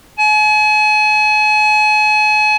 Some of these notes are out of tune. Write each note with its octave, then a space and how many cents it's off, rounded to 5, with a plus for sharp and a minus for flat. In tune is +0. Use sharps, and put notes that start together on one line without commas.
G#5 +40